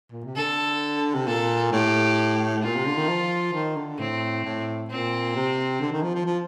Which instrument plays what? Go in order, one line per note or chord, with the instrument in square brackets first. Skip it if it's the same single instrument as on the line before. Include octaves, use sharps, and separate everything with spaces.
[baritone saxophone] A#2
C3
[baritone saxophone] D3 [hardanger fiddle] A4
[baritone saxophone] C3
[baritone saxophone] A#2 [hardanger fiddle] A4
[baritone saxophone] A2 [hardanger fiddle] G4
[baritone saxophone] A#2 [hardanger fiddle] F4
[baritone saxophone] C3
D3
D#3
F3
D#3
D3
[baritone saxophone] A2 [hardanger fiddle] C4
[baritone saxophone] A2
[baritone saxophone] A#2 [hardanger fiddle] C4
[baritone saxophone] C3
D3
D#3
F3
F3
F3